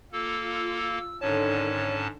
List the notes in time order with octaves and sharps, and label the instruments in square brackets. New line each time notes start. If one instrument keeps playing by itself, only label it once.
[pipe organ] A#3 A4 [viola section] F4 [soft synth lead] E6
[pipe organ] G#2 C#4 A5 [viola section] D3 D#3 A4 [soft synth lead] C#5